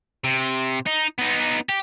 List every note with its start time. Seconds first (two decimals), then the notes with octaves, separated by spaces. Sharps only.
0.24 C3
0.86 D#4
1.18 B3 D#4
1.69 G4